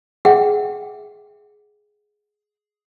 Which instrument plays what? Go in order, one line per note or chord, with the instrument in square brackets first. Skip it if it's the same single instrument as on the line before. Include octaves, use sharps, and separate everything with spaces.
[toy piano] G#4 E5 F#5 G5